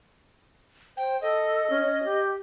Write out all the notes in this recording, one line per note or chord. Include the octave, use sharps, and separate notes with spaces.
C5 G5
A4 D#5
C#4
C#4
G4